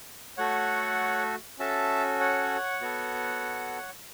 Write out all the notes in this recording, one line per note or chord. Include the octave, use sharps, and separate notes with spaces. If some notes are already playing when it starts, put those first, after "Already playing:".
A3 F#4 A4 C#5 F#5
C#4 F#4 A4 E5 A5
C#5 F#5
B3 F#4 A4